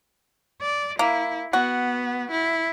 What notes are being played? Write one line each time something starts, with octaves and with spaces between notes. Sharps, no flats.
D5
A#3 E4
B3 F#4
E4